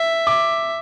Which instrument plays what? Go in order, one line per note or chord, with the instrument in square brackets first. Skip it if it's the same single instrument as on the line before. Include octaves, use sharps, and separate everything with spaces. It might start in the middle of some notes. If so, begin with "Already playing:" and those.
Already playing: [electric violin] E5
[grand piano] D6